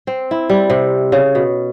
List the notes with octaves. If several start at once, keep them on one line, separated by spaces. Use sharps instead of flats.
C4
E4
G3
C3
C#3
B2